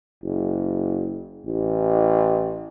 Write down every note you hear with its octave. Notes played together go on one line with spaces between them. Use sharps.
F#1
A1